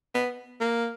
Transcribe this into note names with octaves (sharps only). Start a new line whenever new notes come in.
B3
A#3